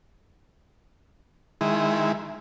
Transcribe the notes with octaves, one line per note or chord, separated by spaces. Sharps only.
D#3 G#3 E4